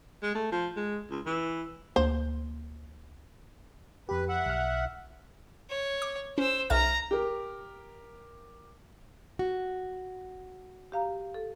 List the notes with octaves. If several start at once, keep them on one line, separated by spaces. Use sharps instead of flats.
G#3
A3
F3
G#3
C#2
E3
D2 A#3 C5
F2 G4 B4
E5 F#5
B1 F6
C#5
D6
C#4 C5 E6
B1 E5 A#5 F6
G4 A#4
F#4
G4 F5 A#5
A4